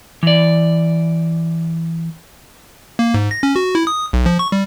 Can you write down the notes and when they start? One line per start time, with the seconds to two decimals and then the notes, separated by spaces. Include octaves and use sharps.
0.23 E3 D5
2.99 A#3
3.14 G#2
3.31 A#6
3.43 C#4
3.56 F#4
3.75 E4
3.87 D#6
4.13 B1
4.26 F3
4.39 C#6
4.52 G3